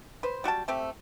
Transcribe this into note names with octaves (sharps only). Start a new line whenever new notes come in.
B4 C5
G3 F#4 G5 A5
A3 C4 G4